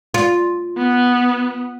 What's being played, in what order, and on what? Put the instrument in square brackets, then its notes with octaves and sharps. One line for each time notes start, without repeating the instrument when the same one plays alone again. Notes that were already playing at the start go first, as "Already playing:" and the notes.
[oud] F4
[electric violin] B3